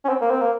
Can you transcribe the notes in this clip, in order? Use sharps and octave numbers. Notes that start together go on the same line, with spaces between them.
C#4
C4
A#3
C4
A#3